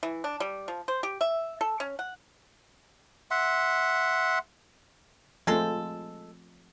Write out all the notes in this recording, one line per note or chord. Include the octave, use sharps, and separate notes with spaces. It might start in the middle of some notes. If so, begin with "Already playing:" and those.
E3
D4
G3
F3
C5
G4
E5
A4
C#4
F#5
E5 F#5 C6
F3 G#3 A3 C4 A4